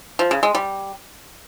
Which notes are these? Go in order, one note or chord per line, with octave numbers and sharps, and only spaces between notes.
F3
C#3
G#3
G3